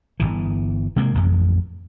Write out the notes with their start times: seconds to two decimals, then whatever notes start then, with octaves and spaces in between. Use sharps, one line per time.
0.20 G1 C#2 E3
0.96 C3 G#3 A#3
1.14 D1 A1 F2